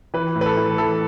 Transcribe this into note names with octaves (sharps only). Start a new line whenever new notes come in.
E3 B4
A2
B4
A4
E3
E3 A4